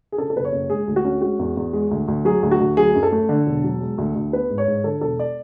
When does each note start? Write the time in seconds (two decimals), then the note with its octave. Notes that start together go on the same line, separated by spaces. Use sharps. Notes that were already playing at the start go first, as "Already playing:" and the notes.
0.12 G#4
0.18 C#3 A4
0.30 A4
0.36 F#1 B4
0.45 C#5
0.52 F#1
0.70 G#3 G#4
0.88 D2
0.96 F#4
1.05 C#4
1.21 G#3 F#4
1.39 E2
1.57 E2
1.73 G#3
1.91 D2
2.08 D2
2.25 F#3 G#4
2.43 D2
2.51 F#4
2.60 D2
2.77 F#3 G#4
2.95 F#2
3.03 A4
3.12 A3
3.29 D3
3.46 E1
3.64 F#3
3.81 G#3
3.98 D2
4.15 D2
4.33 B3 B4
4.50 G#2
4.58 C#5
4.68 G#2
4.84 D3 A4
5.01 E1 A4
5.19 D5